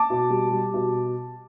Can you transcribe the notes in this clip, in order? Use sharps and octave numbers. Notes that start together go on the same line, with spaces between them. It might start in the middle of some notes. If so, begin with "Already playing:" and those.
Already playing: A5 D6
B2
G3
G3
B2